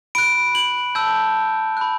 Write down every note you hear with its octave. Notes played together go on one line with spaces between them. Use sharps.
B5 F#6 D7
F#7
A5 E6 G6
B5 F#6